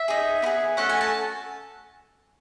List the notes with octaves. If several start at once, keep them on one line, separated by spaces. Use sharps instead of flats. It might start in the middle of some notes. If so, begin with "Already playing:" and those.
Already playing: E5
D#4 G#4
B3 E4 G#4
A3 C#4 F#4 A4 F#5
G#5
A5